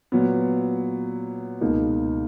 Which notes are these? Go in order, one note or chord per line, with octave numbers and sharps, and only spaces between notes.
A#2 F#3 B3
C#2 B2 A#3 D#4